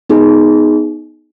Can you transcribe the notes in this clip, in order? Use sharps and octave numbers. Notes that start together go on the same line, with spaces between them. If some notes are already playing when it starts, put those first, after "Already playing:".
B3 D#4 G#4